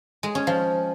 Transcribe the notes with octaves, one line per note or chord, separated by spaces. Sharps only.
G#3
C#4
F3